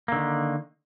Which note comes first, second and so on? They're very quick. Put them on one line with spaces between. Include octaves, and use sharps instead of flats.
A#3 D3 D#3